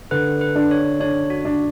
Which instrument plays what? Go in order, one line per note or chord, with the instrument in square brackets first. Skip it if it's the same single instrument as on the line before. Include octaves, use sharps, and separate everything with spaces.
[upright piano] D3 [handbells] B4
[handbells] B4
[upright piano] D4
[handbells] C#5
[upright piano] D4 [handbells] C#5
[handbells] F#4
[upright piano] D4